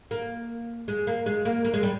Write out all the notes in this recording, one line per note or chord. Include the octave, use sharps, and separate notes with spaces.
A#3
G#3
A#3
G#3
A#3
A#3
G#3
G3